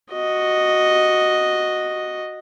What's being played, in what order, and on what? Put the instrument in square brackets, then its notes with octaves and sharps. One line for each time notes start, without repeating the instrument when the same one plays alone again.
[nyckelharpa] F#4 D#5